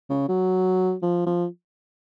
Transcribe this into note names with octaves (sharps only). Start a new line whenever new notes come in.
C#3
F#3
F3
F3